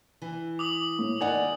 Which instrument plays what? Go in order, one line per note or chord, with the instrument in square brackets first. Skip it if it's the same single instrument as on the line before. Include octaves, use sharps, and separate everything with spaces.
[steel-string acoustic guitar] E3
[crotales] D6 D#6 F#7
[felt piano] A2
[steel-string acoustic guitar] D#2 D#4 D5 [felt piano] A#4 F#5 G#5